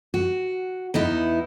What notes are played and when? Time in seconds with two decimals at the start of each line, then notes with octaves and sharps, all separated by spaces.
0.14 F#4
0.94 E2 B3 D#4 E4